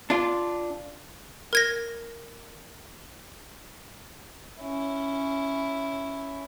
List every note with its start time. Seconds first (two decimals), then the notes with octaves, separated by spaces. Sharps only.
0.10 D4 F4
1.53 A#4 G#6 A#6
4.62 C#4 E4